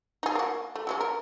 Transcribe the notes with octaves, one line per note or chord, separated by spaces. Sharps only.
D#4 G#4
A#3 F#4
A3
F#3 G#3 C#4
A#4